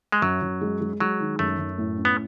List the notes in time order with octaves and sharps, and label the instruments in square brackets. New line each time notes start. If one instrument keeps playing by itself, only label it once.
[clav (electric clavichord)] G#3
[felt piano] F#2 [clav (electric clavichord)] F#3
[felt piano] F#2
G#3
G#3
[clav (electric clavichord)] F#3 [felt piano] G#3
[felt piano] D#3
[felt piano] F#2 [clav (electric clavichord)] A3
[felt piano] F#2
A2
C#4
[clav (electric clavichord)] B3